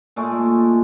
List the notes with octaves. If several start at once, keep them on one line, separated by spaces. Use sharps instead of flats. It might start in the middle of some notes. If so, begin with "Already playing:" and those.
A#2 G#3 A3